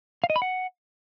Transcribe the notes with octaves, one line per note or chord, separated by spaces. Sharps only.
F5
D#5
B5
F#5